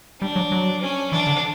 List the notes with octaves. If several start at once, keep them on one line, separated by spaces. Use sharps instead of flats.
G3 D4
F#3
F#3
C#4
E3 D4
D3